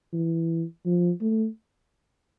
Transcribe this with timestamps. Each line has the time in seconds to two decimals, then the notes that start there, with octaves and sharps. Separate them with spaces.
0.13 E3
0.86 F3
1.22 A3